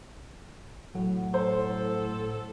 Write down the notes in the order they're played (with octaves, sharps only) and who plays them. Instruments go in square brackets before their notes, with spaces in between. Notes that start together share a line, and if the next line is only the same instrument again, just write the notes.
[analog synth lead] A2 [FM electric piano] F#3 F#5
[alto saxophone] A4 [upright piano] C5